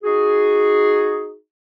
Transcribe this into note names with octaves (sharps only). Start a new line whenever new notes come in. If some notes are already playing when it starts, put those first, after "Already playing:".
D#4 F#4 G#4